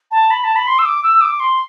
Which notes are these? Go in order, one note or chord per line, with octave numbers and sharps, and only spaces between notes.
A5
B5
A5
B5
C6
E6
D6
E6
D6
C6